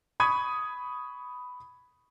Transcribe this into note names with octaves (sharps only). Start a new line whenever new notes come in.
B5 C#6 D#6 G#6 D#7